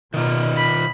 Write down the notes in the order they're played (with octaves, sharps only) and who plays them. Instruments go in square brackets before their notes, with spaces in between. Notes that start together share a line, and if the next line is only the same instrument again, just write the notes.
[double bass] B2 [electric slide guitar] D#3 F4
[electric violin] B5